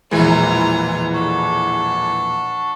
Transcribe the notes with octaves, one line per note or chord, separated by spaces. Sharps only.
A#1 E2 B2 E3 G#3 F4 A#5
D4 F#4 A4